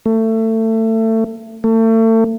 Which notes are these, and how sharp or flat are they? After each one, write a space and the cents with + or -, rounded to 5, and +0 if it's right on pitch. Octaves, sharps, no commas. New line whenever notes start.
A3 +25
A3 +35